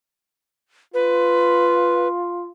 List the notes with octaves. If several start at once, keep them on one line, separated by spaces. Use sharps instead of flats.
F4 B4